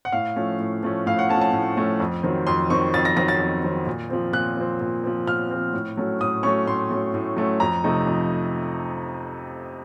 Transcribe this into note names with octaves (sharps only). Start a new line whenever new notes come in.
F#5
A2 F5
F3 A3 C#4
A2
F3 A3 C#4
A2 F5
F#5
F3 A3 C#4 A5
A5
A2
F3 A3 C#4
F2
D#3 F#3 C4
F2 C6
D#3 F#3 C4 C#6
F2 A6
A#6
D#3 F#3 C4 A#6
A6
F2
D#3 F#3 C4
A#2
F3 C4
A#2 F#6
F3 C4
A#2
F3 C4
A#2 F6
F3 C4
A2
F#3 A3 C#4
A2 D#6
F#3 A3 C#4 C#6
A2 C6
F#3 A3 C#4
A2
F#3 A3 C#4
F2 A#5
C3 F3 A3 D#4
F2